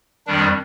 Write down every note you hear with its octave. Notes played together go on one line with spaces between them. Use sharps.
F2 D#3 G3 D4